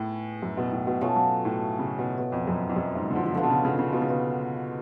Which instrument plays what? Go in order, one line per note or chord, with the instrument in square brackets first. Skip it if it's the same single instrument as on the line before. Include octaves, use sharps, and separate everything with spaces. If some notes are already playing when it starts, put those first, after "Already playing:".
Already playing: [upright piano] A2 [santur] B3 G#4
[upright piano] F#2
B2
A2
B2
[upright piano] B2 [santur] A3 C#4 F4
[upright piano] F#3
A2
C#3
B2
B2
F2
F#2
F2
F#2
G#2
D3
F3
F3
[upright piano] D3 [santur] B3 F4 A4
[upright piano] B2
C#3
C#3
C#3
B2
C#3
B2